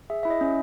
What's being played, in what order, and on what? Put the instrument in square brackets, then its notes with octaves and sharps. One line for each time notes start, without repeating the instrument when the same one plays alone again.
[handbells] G#4 E5
E4 E5
D#5
C#4